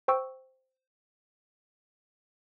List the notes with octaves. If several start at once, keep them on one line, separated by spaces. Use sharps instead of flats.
C5 G5 C#6 E6